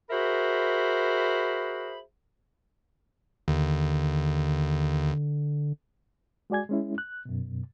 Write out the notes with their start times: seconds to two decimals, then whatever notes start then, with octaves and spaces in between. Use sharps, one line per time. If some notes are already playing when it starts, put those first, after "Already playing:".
0.10 F#4 G#4 A#4 C5 E5 B5
3.48 D#2 D3
6.50 G#3 F#4 D5 G#5 G#6
6.69 G#3 C#4 E4
6.98 F#6
7.25 F#2 B2